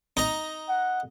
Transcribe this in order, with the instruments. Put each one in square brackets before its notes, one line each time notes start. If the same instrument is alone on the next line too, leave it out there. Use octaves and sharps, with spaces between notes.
[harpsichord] D#4 A#5
[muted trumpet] F#5